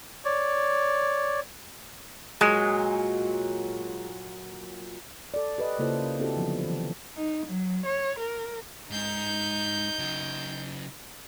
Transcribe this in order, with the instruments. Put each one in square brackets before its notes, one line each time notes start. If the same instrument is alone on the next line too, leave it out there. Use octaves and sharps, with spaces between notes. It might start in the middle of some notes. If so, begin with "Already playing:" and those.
[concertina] C#5 D5
[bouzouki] A#2 F#3 [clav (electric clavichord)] G#3
[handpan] A4 D5
G4 B4 D#5
C#3 A#3 E4 F4 A4 C5
C4 D4 E4 F#4 G4 A4
D3 F3 F#3 B3
E3 F#3
[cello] D#4
F#3
C#5
A#4
[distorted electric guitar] G#2 G#3 [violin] D#4 G6
[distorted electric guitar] C#3 F#3